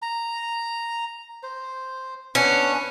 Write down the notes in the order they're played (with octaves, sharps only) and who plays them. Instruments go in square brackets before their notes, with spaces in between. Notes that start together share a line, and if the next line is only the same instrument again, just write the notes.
[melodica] A#5
C5
[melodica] B3 D4 B4 [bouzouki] C#4